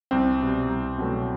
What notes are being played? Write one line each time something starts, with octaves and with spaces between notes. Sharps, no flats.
C2 C4
B2 G3
C2
B2 F#3 A3